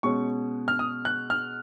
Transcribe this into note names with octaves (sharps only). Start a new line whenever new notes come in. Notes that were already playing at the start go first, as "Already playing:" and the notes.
B2 G#3 C#4 C#6
F6
D#6
F#6
F6